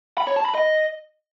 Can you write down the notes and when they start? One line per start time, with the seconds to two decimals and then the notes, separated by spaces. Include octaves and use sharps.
0.18 B5
0.27 C#5
0.36 A5
0.45 B5
0.55 D#5